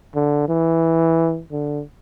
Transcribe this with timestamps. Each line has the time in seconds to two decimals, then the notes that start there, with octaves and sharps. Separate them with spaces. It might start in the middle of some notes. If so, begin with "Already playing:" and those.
0.15 D3
0.49 E3
1.51 D3